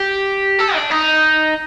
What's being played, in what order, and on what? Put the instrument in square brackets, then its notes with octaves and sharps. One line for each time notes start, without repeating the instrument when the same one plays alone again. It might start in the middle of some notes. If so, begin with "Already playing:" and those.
Already playing: [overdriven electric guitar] G4
A4
D4
D#4